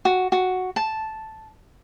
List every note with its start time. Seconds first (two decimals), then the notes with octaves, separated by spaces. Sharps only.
0.05 F#4
0.32 F#4
0.76 A5